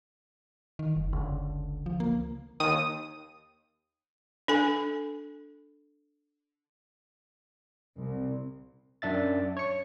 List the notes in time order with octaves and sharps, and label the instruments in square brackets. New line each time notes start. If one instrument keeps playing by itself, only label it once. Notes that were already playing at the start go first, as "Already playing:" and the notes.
[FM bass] D#3
F#1
[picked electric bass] C#2 D3
[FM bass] F3
A#3
[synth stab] D#2 D#6 D#7
[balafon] D4 A4 G#5
[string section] C2
[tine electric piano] F#2 D4 E5 A6
C#5 C#7